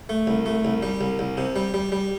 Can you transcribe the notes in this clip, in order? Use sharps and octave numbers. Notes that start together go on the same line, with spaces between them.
A3
C2
A3
C2
G3
C2
C2
C3
G3
G3
G3